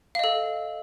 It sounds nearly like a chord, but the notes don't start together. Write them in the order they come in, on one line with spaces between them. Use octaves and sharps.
F5 D#5 A4